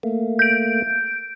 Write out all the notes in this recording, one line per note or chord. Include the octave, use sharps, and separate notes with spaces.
A3 A#3
G6 D7